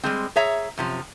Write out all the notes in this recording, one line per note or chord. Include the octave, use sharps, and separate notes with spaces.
G3 G#3 C4
G#4 C#5 E5 A#5
F#2 C3 F3